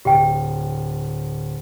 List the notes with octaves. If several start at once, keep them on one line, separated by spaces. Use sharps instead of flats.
D1 G4 G5